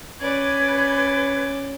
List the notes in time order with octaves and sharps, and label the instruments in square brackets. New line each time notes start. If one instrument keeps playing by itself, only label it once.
[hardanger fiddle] C#4 D5 [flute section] B4 G#6